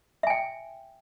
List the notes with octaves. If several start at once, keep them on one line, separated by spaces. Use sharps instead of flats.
E5 G5 G#5